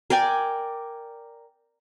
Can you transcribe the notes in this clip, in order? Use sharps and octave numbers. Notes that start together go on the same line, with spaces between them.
A#4 D5 G5 G#5